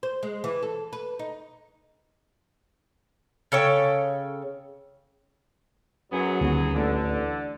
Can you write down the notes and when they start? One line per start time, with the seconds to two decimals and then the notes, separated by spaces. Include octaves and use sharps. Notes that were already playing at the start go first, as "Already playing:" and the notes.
0.03 C5
0.23 G#3
0.44 E3
0.63 A4
0.93 B4
1.19 D#4
3.52 C#3 A4 C#5 G5
6.12 F#2 F#3 B3 G#4
6.41 D#1 D2
6.75 A1 D3